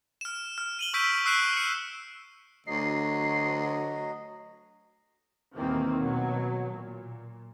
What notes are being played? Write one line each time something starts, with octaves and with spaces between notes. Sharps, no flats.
F6 E7
F6
D#7 F#7 G7
C#6 E6 G6 B6 D7
C#6 E6 F#6 C7 D7 E7
C#7
D2 F#3 D#5 C7
D#2 B2 D#3 E3 A#3 C4
B2 F#3
A#2